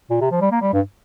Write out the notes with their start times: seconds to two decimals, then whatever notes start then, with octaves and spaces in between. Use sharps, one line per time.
0.10 A#2
0.21 C3
0.31 F3
0.41 G3
0.51 A#3
0.62 G3
0.73 G2